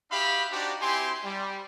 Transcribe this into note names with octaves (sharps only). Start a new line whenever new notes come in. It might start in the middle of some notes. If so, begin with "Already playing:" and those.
D#4 F#4 G4 E5 F5 B5
D4 D#4 F#4 G4 C5 D5
C4 E4 G4 G#5 C6
G3